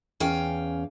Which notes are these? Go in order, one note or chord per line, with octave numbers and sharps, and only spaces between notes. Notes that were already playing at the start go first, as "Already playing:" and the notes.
E2 C#4 F5 G5